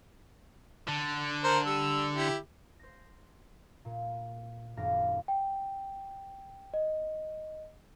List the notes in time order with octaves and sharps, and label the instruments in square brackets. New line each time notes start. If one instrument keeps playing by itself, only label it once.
[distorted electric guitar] D3
[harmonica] A#4 C5 A#5
G3 E6
E4 G4
[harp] C5 A#6
A#2
D#1 F#2 C4 F5 D6 A#6
[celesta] G5
D#5